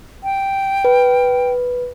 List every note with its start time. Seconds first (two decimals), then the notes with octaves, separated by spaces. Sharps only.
0.24 G5
0.85 B4